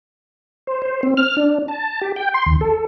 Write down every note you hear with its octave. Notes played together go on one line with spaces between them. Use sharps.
C5
C5
C4
F6
D4
A5
G4
G5
C6
D#2
A4